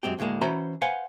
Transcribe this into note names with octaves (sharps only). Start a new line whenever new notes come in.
F#2 G#3 C4 G4
D2 A2 F3 G#3 A#3
E3 C#4 F#4 C5 A#5 B5
B4 C5 F5 F#5 G#5